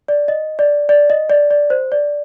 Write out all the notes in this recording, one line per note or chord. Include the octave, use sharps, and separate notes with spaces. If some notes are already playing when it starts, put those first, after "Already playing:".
D5
D#5
D5
D5
D#5
D5
D5
C5
D5